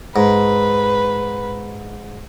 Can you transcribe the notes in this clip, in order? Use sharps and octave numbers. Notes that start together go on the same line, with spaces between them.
G#2 B4